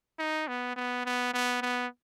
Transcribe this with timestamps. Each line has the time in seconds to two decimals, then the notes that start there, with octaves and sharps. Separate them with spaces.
0.19 D#4
0.48 B3
0.76 B3
1.05 B3
1.34 B3
1.62 B3